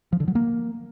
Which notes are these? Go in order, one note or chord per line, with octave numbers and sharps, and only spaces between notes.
F3
D3
F#3
A#3